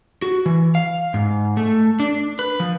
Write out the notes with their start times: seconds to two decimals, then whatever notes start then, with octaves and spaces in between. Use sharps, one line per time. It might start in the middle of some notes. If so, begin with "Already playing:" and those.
0.22 F#4
0.46 E3
0.75 F5
1.14 G#2
1.57 A3
2.00 D4
2.39 B4
2.60 F3